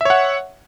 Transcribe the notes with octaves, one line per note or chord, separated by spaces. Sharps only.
C#5 E5 F#5